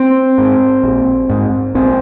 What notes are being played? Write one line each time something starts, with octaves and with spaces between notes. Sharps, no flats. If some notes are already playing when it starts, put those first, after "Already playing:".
Already playing: C4
G#2
A#1
G#2
A#1 C4